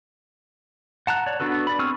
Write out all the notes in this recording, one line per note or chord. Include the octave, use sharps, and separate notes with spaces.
F#5 A5 A#5 F#6
C#5 D5
B3 D4 F#4 A4 B4
B4 D5 B5
C4 G#4 C#6 E6 F6